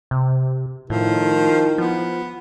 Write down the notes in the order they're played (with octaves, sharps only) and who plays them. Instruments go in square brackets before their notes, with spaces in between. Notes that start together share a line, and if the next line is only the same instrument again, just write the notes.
[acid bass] C3
[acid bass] A2 [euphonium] D#3 [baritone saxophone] F3 [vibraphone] E4
[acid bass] F3 [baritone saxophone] B3